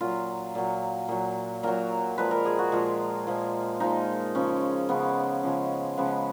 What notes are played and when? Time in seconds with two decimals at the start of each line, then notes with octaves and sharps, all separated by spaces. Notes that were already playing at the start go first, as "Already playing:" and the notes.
0.01 A#2 F#3 F4
0.55 A#2 F#3
1.09 A#2 F#3
1.63 A#2 F#3 A#4
2.18 A#2 F3 G#3 B4
2.31 A#4
2.45 G#4
2.59 F#4
2.72 A#2 F3 G#3 F4
3.27 A#2 F3 G#3
3.80 A#2 F3 G#3 D#4
4.35 C#3 F3 G#3 C#4
4.89 C#3 F3 G#3 B3
5.43 C#3 F3 G#3
5.97 C#3 F3 G#3 B3